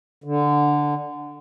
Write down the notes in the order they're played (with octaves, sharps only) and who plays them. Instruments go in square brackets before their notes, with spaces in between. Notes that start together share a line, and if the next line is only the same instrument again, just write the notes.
[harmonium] D3